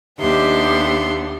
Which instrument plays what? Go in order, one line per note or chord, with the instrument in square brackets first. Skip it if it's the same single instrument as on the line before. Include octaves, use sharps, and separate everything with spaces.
[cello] D#2 [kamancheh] B3 D4 [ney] G4 [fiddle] E5 C6